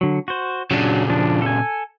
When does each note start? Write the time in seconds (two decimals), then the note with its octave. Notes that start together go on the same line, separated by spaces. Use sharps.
0.01 D3 F#3
0.28 F#4 C5
0.71 A#2 C#3 F#3 D4
1.09 F3 D4
1.42 A4 G#5